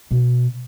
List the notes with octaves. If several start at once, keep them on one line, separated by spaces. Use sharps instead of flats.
B2